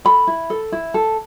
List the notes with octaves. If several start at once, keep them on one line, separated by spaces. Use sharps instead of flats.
A4 B5
E4
A4
E4
A4